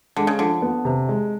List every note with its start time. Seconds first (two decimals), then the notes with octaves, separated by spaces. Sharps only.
0.17 D3 G#3
0.27 C#3
0.39 D3 F3
0.62 B3
0.85 C3
1.09 G#3